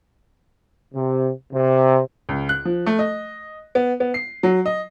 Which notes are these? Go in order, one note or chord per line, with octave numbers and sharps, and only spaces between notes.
C3
C3
C#2
F#6
F3
A3
D#5
B3
B3
C7
F#3
D#5